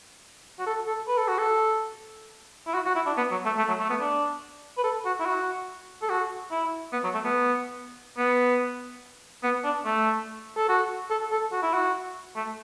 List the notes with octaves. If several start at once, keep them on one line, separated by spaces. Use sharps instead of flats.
F#4
A4
A4
B4
A4
F#4
A4
E4
F#4
F#4
E4
D4
B3
F#3
A3
A3
F#3
A3
B3
D4
B4
A4
F#4
E4
F#4
A4
F#4
E4
B3
F#3
A3
B3
B3
B3
D4
A3
A4
F#4
A4
A4
F#4
E4
F#4
A3